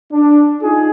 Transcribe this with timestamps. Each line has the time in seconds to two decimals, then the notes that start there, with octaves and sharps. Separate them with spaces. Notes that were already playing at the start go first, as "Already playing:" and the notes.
0.12 D4
0.61 D#4 F4 G#4